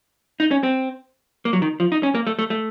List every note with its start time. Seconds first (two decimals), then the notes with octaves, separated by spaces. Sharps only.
0.40 D#4
0.51 C#4
0.63 C4
1.45 A#3
1.53 F#3
1.62 D#3
1.80 F3
1.92 D#4
2.03 C#4
2.15 A#3
2.27 A3
2.39 A3
2.50 A3